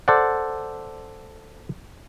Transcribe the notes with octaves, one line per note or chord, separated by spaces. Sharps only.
A4 C5 D5 F#5